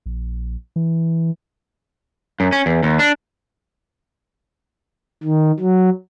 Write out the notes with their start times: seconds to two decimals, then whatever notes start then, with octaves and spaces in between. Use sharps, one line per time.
0.06 A#1
0.76 E3
2.40 F#2
2.52 C#4
2.66 E2
2.83 D#2
2.99 D4
5.24 D#3
5.59 F#3